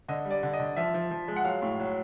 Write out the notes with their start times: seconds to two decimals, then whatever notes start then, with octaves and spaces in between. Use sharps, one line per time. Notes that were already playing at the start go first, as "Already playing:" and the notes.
0.08 D3 D#5
0.25 G3
0.31 D5
0.43 D3
0.53 D#5
0.60 D3
0.77 F3 E5
0.94 F3
1.11 F3
1.28 G#3
1.36 F#5
1.45 F#3 F5
1.62 A2
1.80 F#3